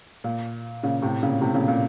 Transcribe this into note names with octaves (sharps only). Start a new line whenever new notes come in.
A#2
A#2 C#3
A2 C3
A#2 C#3
A2 C3
A#2 C#3
A#2 C#3